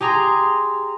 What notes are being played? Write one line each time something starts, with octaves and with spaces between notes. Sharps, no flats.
G4 G#4 A#5 C6